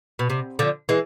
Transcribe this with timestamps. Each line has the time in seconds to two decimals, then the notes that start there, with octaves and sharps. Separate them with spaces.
0.19 B2
0.30 C3
0.59 D3 F3
0.89 E3 G#3